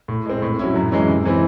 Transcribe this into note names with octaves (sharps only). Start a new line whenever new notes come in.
A2
G#3 C4
A2
F#3 C#4 E4
F#2
E3 G#3 C#4 E4
C3
E3 C4 E4